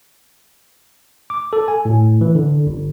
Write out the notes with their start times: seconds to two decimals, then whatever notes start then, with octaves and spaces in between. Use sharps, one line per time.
1.30 D6
1.53 A4
1.68 G#5
1.85 A2
2.21 E3
2.35 D3
2.67 G1